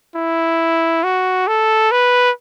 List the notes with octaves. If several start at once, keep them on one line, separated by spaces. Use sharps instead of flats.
E4
F#4
A4
B4